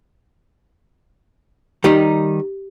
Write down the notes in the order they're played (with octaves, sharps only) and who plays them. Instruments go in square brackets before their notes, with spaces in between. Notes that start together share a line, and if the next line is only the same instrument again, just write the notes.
[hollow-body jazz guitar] D#3 G3 D#4 [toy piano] G4